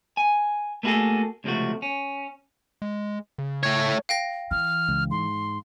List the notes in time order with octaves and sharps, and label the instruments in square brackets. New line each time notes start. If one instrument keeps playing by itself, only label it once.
[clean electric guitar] G#5
A3 A#3 E4 F#4 G#4 A4
C#2 C3 F3 A3 F#4
C#4
[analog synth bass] G#3
C#3
[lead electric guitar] A3 C#5
[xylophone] F5 G5 A#6
[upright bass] E3 [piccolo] F6
[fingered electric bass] C#2
[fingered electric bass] G#2 [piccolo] C6